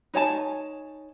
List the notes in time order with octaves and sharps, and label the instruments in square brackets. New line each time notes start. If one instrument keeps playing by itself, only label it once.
[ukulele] D#4 C#5 G#5 A5